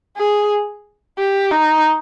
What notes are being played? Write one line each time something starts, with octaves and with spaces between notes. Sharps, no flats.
G#4
G4
D#4